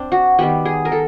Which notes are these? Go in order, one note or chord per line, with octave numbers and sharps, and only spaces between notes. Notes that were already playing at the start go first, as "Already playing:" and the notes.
Already playing: C4 D4
F#4
D#3 G3 B3 G4
G#4
A#4
A4